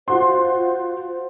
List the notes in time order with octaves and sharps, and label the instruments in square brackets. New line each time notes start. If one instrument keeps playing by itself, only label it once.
[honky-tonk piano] F4 F#4 C6 [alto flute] C5